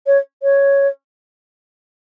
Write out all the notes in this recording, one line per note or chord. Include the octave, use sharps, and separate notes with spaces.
C#5
C#5